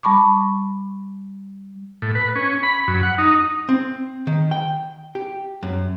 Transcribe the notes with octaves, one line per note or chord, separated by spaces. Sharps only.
G3 A5 B5 C#6 D6
A2
B4
C#4
B5
F#2
F#5
D#4
C4
D#3
G5
G4
F#2